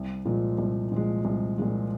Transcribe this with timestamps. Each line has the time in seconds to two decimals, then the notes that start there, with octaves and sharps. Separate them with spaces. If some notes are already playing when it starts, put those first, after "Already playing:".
Already playing: C2
0.25 A#2 F3 G#3
0.58 C2
0.92 A#2 F3 G#3
1.25 C2
1.58 A#2 F3 G#3